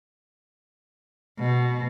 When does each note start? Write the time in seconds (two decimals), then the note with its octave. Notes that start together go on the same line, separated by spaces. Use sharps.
1.39 B2